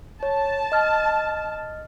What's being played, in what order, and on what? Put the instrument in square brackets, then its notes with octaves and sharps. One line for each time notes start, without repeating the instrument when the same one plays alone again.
[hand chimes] C#5 [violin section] A5
[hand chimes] D#5 F6 A6